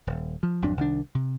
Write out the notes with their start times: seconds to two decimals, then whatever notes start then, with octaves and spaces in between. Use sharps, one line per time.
0.07 D#1
0.43 F3
0.62 G#1 F2 F#3 D4
0.77 C2 D#3 D4
1.15 C3